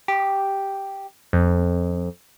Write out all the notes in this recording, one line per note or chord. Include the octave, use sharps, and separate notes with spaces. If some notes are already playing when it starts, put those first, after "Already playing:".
G4
F2